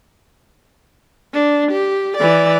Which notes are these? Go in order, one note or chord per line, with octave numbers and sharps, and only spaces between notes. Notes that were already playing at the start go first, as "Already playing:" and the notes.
D4
G4
E3 D5